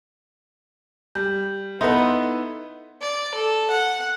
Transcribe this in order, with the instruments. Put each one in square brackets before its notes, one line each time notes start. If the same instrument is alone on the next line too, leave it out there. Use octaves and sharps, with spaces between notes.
[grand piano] G3 [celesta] G6
[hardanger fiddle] B3 [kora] D#4 [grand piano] E4 A4 B4 [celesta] D#5 C6
[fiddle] D5
A4
F#5